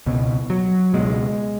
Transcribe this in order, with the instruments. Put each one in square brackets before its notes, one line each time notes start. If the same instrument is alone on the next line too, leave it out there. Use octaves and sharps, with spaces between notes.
[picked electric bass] C#2 B2
F#3
C#2 B2 G#3